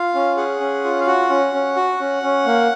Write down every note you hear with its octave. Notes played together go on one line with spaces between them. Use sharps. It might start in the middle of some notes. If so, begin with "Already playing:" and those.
Already playing: F4 F5
C#4
G#4 F#5
C#4
F4
F5
F#4 F#5
C#4
C#4
F#4
C#4
C#4
A#3